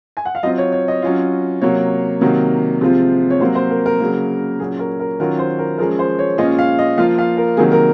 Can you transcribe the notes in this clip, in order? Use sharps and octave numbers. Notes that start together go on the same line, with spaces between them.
G#5
F#5
F5
F#3 C4 F4 D#5
C#5
C#5
D#5
F#3 C#4 F4
C3 F#3 A#3 C#5
C3 D#3 F#3 A#3
C3 F3 G#3 C4 F4
C#5
C3 F#3 A#3 C5
C5
A#4
A#4
C#3 F#3 A#3
A#2 F#3 C#4 G#4
A#4
A#4
D#3 F#3 C#4 F4 A#4
C5
A#4
F3 G#3 C#4 A#4
C5
C#5
A#2 G#3 C#4 F4 D#5
F5
D#5
F3 A#3 F4 F5
F5
A#4
C3 D#3 F#3 A#3 G#4
A#4